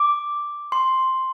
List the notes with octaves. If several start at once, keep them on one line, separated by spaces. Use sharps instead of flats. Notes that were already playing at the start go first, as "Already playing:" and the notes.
Already playing: D6
C6